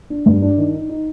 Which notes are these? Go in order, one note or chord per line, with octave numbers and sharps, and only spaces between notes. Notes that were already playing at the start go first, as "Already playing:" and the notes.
D4
G2
D4
D#3
D#4
D#4